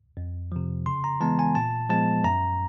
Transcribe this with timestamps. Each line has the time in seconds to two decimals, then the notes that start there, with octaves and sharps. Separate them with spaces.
0.17 F2
0.52 C3 F3
0.86 C#3 C6
1.04 A#5
1.21 E3 G#3 B3 A5
1.39 G#5
1.55 A#2 A5
1.90 F3 G#3 B3 A5
2.24 F#2 A#5